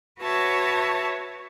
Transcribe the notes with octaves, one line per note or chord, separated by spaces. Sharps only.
F#4 B4 C#5 E5 A5